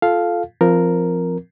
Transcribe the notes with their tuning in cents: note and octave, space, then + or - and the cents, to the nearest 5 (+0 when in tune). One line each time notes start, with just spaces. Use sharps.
F4 +0 A4 -15 F5 +0
F3 -10 C4 +0 A#4 +0